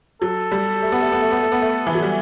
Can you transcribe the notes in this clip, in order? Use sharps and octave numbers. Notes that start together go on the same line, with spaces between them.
F#3 A4
G3
A3
B3
A3
B3
A3
B3
A3
B3
A3
E3
F#3
G3